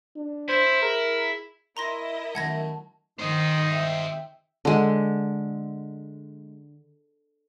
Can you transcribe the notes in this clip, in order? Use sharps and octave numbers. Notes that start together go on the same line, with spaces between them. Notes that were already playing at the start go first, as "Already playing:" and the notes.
D4
E4 C5
G#4 A#4
E4 A#4 D#5 A#5 C6 A#6
F#2 D#3 A3 F#5 A5 G#6 A#6
D#3 D#4 C5 D#5
E5 G5
D3 G#3